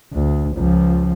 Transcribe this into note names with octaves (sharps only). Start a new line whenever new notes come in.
D2
C#2 F3